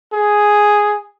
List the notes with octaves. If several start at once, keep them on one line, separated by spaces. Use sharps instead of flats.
G#4